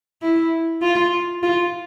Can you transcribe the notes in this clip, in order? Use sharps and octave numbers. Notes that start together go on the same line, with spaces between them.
E4
F4
F4